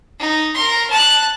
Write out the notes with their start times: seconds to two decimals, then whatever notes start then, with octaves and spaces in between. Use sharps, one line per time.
0.19 D#4
0.54 A#4 C6
0.90 A5 F#6